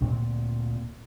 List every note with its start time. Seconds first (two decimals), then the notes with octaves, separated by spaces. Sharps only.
0.01 D2 A#2 C4